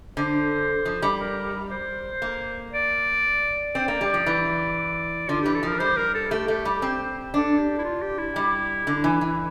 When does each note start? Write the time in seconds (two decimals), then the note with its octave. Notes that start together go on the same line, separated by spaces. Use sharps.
0.17 D3 C5
0.85 F3
1.02 G3
1.20 A#4
1.71 C5
2.22 A#3
2.73 D5
3.75 C4 D5
3.88 A#3
4.01 G3
4.14 F3
4.26 E3
5.29 D3 F4
5.42 E3 G4
5.55 A4
5.63 F3 A#4
5.79 G3 C5
5.97 A#4
6.15 A4
6.31 A3 G4
6.48 A3
6.65 G3
6.82 C4
7.34 D4 A4
7.59 G4
7.78 E4
7.84 F4
8.02 G4
8.18 E4
8.36 G3
8.87 D3
9.04 E3
9.21 E3